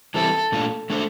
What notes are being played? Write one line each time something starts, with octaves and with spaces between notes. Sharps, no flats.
E3 G3 C4 E4 A4
A#2 A3 D4 F4
A3 D4 A4 C5